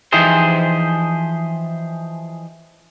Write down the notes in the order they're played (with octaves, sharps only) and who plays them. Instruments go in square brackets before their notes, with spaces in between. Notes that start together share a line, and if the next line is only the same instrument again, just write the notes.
[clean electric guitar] E3 F3 D#4 G4 G#4 C5